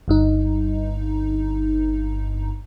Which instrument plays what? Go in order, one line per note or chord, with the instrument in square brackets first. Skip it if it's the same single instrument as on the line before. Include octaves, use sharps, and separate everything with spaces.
[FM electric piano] G1 G2 D#4